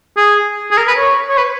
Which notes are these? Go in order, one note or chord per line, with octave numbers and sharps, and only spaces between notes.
G#4
G#4
A#4
B4
C#5
C#5
B4